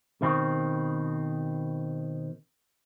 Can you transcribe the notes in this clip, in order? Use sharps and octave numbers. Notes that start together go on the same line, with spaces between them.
B2 D#3 C4